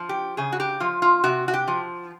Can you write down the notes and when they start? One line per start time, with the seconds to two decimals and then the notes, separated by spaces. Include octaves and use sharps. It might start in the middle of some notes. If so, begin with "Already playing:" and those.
Already playing: F3
0.09 G4
0.37 C#3 G#4
0.53 F#4
0.60 G4
0.80 F3 F4
1.02 F4
1.24 C3 F#4
1.48 F#4
1.54 G4
1.68 F3